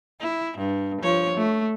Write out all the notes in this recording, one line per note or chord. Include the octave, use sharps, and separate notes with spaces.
E4
G2
F3 C#5
A3